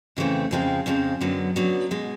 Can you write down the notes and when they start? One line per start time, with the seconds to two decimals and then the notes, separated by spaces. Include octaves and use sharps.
0.17 F2 C#3 E3 A3 C4
0.51 F2 C#3 F3 G#3 C4
0.86 F2 C#3 F3 G#3 C4
1.21 F#2 D3 F#3 B3
1.56 F#2 D3 F#3 B3
1.91 B2 G#3